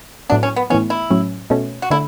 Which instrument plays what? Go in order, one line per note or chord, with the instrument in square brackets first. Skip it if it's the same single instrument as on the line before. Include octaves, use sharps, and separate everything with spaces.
[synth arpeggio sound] A2 F#3 B3 [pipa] D4
[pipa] C#4
B3
[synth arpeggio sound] A2 E3 B3 [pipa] C#4
[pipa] E4
[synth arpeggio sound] A2 F#3 C#4
B2 A3 C#4
[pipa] F#4
[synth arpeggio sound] D3 A3 [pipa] E4